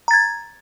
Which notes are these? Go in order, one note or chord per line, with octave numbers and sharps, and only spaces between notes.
A#5 G#6 A6